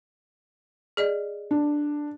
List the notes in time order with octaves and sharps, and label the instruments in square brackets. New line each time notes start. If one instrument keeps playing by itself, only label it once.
[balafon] G#4 D5 D#5
[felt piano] D4